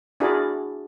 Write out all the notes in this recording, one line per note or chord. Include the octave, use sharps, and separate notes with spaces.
D4 E4 F#4 G#4 A#4 D5